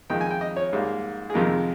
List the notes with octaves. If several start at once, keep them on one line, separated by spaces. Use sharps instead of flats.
F2 D#3 G#3 G5
G#5
G5
D#5
C#5
G#2 G3 A#3
G#4
F2 C3 D#3 G#3 A#4